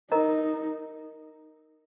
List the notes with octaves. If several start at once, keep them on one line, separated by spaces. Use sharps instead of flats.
D#4 A#4 D#5 A#5